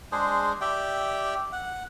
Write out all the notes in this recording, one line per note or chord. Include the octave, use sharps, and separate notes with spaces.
G#3 D4 G#4 C5
G4 D5 E5 G5
F#5